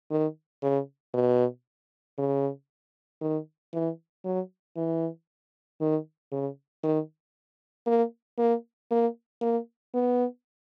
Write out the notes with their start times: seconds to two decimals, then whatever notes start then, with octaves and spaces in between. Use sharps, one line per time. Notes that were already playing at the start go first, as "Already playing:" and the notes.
0.11 D#3
0.63 C#3
1.14 B2
2.18 C#3
3.21 D#3
3.73 E3
4.24 F#3
4.76 E3
5.80 D#3
6.32 C#3
6.83 D#3
7.87 A#3
8.38 A#3
8.91 A#3
9.41 A#3
9.94 B3